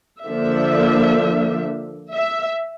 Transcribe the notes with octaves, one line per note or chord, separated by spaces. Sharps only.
D3 F3 A#3 D4 E5
E5